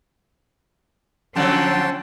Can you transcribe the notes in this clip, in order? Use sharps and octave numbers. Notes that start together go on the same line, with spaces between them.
D3 F3 F#3 C#4 G5 A5 C6